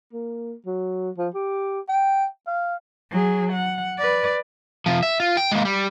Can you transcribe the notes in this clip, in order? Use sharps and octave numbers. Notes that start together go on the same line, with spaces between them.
A#3
F#3
F3
G4
G5
F5
F#3 G#4
F#5
B4 D5
C3 F3
E5
F4
G5
G#3 A#3
G3